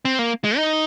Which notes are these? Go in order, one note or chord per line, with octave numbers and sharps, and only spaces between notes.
C4
A#3
G#3
D#4